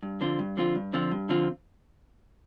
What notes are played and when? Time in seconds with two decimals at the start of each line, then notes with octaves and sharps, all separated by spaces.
0.03 G2
0.21 D3 F3 C4 F4
0.39 G2
0.57 D3 F3 C4 F4
0.75 G2
0.93 D3 F3 C4 F4
1.11 G2
1.29 D3 F3 C4 F4